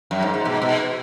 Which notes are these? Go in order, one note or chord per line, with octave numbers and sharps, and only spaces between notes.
F#2
G#2
G#2
B2
B2